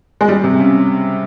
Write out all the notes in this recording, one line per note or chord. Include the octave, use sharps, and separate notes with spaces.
G#3
G3
C3
C#3